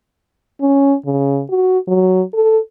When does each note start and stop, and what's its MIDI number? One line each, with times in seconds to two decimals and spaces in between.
0.61 0.95 61
1.05 1.42 49
1.50 1.78 66
1.88 2.22 54
2.34 2.59 69